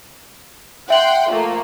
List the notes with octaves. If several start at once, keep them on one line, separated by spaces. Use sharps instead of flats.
E5 F#5 G5 C6 F#7
F3 A3 A#3